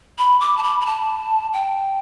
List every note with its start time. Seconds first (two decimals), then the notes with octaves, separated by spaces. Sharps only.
0.18 B5
0.40 D6
0.57 A5
0.63 B5
0.81 B5
0.86 A5
1.53 G5